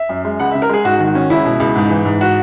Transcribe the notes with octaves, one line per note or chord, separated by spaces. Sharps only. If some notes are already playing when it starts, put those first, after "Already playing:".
Already playing: E5
F#2
G#3
C#2 F#5
E5
C#3
A#4
G#3 G#4
G#2 F#4
D#3
F#4
C#4
C#2 E4
B2
C#2
G#2
E3
G#2
F#4